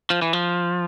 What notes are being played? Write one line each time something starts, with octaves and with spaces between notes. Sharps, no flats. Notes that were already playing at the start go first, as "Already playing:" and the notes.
F3
E3
F3